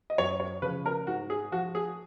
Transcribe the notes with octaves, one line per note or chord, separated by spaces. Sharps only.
D#5
F#2 C#5
C#5
C#3 F3 B4
A#4
G#2 F#4
G#4
F3 F#4
G#4